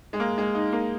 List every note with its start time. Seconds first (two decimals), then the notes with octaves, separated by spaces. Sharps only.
0.13 G#3
0.20 A#3
0.38 G#3
0.55 D#4
0.73 A#3